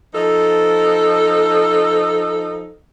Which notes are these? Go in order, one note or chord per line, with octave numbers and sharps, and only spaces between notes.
F3 D#4 A4